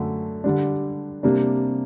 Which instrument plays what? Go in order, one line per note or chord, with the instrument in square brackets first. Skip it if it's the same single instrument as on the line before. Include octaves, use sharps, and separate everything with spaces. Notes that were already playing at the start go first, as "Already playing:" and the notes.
Already playing: [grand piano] F#2 D3 A3
D3 G3 D4
C3 G3 A#3 D4